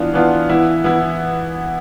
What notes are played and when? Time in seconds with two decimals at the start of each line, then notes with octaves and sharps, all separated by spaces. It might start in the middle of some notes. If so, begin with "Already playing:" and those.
Already playing: E3 B3 D4 F4
0.14 E3 B3 D4 F4
0.49 E3 B3 E4
0.84 E3 B3 E4